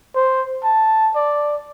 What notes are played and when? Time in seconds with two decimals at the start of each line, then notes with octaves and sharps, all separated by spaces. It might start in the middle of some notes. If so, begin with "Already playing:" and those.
0.15 C5
0.64 A5
1.15 D5